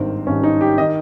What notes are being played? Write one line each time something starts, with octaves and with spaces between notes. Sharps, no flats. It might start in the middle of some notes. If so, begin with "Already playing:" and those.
Already playing: G#1 G2 D#3 C4
G#1 G2 D#3 C#4
D#4
G4
D#3 D#5